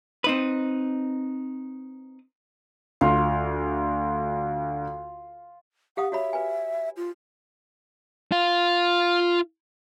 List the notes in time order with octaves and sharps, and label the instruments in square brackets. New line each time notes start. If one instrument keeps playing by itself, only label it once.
[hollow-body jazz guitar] C4 D#4 B4
[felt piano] D2 [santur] F4
[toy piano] G4 F5 D#6 [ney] F#5
[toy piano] F#4 C#5 B5 [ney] E5
[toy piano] B4 G#5
[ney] F4
[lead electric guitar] F4 F5